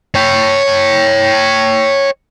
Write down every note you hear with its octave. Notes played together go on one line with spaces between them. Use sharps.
C#5 G5